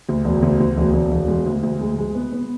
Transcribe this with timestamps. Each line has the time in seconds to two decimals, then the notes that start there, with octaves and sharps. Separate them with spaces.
0.09 D2
0.25 E1
0.42 D2
0.60 D2
0.77 E1
0.94 E1
1.12 E1
1.28 G#3
1.46 D2
1.63 D2
1.81 G#3
1.98 G#3
2.15 B3
2.33 B3